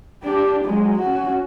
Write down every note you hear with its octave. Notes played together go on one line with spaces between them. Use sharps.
D4 G4
F#3 G#3
C#4 F#4